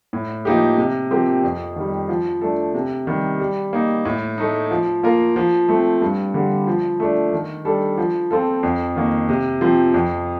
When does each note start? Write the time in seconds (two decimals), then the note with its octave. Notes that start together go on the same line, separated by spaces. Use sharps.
0.13 A2
0.45 F3 A#3 D#4 G4
0.78 C3
1.11 F3 C4 G4 A#4
1.44 F2
1.76 D#3 G3
2.09 F3
2.41 A3 D4 A4
2.74 C3
3.07 D#3 G3
3.40 G3
3.73 A#3 D#4
4.05 A2
4.38 A3 D#4
4.71 F3
5.03 A#3 F4 A#4
5.36 F3
5.69 A3 C4
6.02 G2
6.34 D3 G3
6.67 F3
7.00 A3 D4
7.33 D#3
7.65 G3 D4 A4
7.98 F3
8.31 C4 F4 A4
8.63 F2
8.96 D#3 A#3
9.29 C3
9.61 F3 C4
9.94 F2